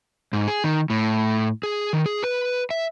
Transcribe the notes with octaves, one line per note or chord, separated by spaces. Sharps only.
G#2
G#4
D#3
A2
G#4
D#3
G#4
B4
E5